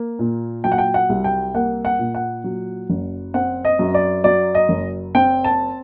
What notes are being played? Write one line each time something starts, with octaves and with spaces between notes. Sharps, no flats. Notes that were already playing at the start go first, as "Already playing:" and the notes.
Already playing: A#3
A#2
F#3 G5
F#5
G5
F#5
C2
G5
A#3 F#5
F#5
A#2
F#5
F#3
F#1
C4 F#5
D#5
F#2
D5
F#3 D5
D#5
F#1
C4 G5
A5